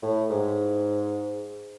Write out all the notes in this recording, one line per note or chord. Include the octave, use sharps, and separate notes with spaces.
A2
G#2